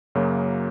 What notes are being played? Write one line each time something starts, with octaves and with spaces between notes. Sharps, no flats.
F#2 C#3 F#3 A#3